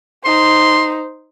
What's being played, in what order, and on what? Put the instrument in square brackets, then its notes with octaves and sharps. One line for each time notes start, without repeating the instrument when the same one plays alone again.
[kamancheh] D#4 C5 [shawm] C6